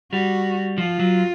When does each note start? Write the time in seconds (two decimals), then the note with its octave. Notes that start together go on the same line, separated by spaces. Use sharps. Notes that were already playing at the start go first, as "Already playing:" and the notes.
0.12 G3 F#4
0.78 F3 F4
1.00 F#3